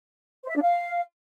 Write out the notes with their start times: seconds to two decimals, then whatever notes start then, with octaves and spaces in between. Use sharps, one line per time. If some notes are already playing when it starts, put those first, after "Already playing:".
0.43 C5
0.49 E5
0.56 D4
0.62 F5